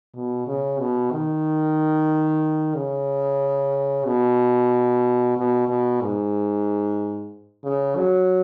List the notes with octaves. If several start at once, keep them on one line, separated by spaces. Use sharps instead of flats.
B2
C#3
B2
D#3
C#3
B2
B2
B2
G#2
C#3
F#3